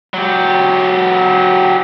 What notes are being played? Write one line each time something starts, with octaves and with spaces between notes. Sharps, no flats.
F#3 G4